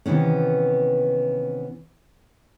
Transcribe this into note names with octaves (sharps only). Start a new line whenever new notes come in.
C3 D#3 E3 B3 C#4